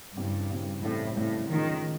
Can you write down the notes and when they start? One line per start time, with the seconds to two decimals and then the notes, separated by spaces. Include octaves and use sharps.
0.17 G2 C#3 E3 G3 C4
0.50 C#3 E3 G3 C4
0.83 A2 C#3 E3 G3 C4
1.17 A2 C#3 E3 G3 C4
1.51 A2 D#3 F3 G#3 C#4